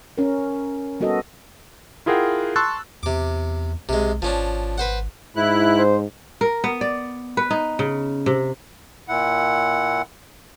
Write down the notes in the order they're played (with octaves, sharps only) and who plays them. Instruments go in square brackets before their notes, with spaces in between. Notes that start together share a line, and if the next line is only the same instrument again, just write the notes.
[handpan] C#4 A#4
G3 B3 F#4 A4 D#5
[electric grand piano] E4 F4 G#4 A#4 F#5 G5
A5 C6 C#6 E6 F#6 A6
[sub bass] E2 [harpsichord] C3 D6
[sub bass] B1 [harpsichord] C3 G#3
[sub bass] G#1 [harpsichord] F3 C#4 D4
[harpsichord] B4 C5 F#5
[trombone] G#2 [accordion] E4 F#6
[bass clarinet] C5
[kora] A#4
B3
D5
B4
D#4
C#3
C3
[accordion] A#2 E4 F#5